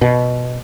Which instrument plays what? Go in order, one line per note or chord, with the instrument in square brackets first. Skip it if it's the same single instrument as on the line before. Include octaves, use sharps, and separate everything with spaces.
[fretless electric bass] B2